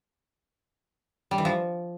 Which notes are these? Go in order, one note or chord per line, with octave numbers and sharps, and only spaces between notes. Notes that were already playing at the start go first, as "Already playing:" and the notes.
G3
E3
F3